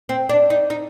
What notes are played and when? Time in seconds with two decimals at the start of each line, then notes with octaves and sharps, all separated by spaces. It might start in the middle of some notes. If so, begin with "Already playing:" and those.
0.09 C4
0.29 D4
0.50 D#4
0.70 D#4